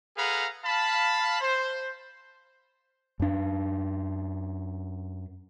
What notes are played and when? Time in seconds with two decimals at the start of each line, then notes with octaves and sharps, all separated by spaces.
0.17 G#4 A4 B4 F5 F#5 A#5
0.64 F5 A5 B5
1.41 C5
3.20 F#2 D4